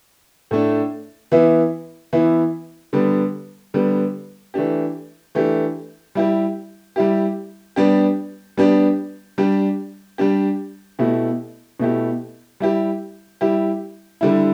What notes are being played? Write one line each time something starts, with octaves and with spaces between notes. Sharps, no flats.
A2 A3 D4
E3 B3 E4
E3 B3 E4
D3 G3 B3
D3 G3 B3
E3 A3 D4 G4
E3 A3 D4 G4
G3 E4 G4
G3 E4 G4
G3 B3 D4 G4
G3 B3 D4 G4
G3 D4 G4
G3 D4 G4
B2 A3 E4 G4
B2 A3 E4 G4
G3 E4 G4
G3 E4 G4
D3 G3 E4